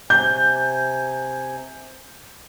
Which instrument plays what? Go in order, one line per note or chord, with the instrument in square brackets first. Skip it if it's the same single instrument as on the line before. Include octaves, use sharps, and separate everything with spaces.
[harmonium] C3 G#5 [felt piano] G6